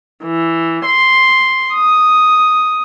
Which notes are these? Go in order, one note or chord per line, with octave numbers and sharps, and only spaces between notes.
E3
C6
D#6